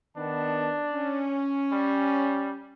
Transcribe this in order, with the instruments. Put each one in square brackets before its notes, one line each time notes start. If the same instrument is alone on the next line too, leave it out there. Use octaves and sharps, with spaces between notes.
[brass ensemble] D#3 B3 A5 [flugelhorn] D4
[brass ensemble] C#4
[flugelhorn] G3